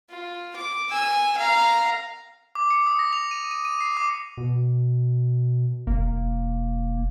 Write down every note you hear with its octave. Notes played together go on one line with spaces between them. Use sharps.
F4
D6
G#5 E6
F5 A#5
D6
C#7
D#6
A#6
F7
D#7
D#7
D#7
C7
D6
B2
E1 A#3